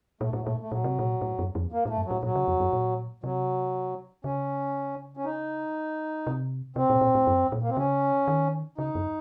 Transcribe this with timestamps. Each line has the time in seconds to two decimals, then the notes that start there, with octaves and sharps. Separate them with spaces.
0.21 A#2 A3
0.31 A2 F#3
0.41 A3
0.47 A#2
0.60 A3
0.72 A#2 F#3
0.84 C3
0.99 A#2
1.21 A2
1.39 F#2
1.55 F2
1.72 A#3
1.85 A2
1.89 A3
1.97 F#2
2.06 F#3
2.11 A2
2.23 A#2 F#3
2.35 C#3
2.48 F2
2.60 F#2
2.73 A#2
3.24 C3 F#3
4.24 C#3 C#4
5.17 C#4
5.25 D#4
6.27 C3
6.76 C3 C4
6.90 A#2
7.01 A#2
7.15 A2
7.27 F#2
7.52 A#2
7.63 A#3
7.69 C4
7.77 C#3 C#4
8.28 D#3
8.78 C#3 D#4
8.95 F#2